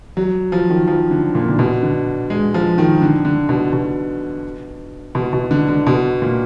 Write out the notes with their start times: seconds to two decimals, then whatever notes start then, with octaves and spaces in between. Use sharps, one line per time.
0.17 F#3
0.52 F3
0.70 D#3
0.87 F3
1.11 D3
1.35 A#2
1.48 D3
1.59 B2
1.83 D3
2.30 G#3
2.54 F3
2.78 D#3
3.02 D3
3.25 D3
3.49 B2
3.73 B2
5.15 B2
5.33 B2
5.51 D3
5.69 D3
5.87 B2
6.22 A#2